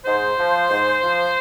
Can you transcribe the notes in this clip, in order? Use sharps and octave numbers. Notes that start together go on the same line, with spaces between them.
G#2 C5
F3
G#2
F3